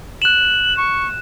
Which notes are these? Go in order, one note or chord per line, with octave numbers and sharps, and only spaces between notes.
F#6 E7 F#7
C#6